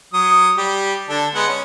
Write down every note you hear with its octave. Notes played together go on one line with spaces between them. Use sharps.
F#3 D#6
G3 G4
D3 D4 A4
G#3 B3 F#5
C#4